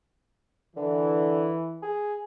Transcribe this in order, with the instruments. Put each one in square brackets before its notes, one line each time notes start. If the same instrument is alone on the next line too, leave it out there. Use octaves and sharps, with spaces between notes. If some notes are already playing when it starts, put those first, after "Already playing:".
[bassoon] D3 [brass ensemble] E3
[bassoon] G#4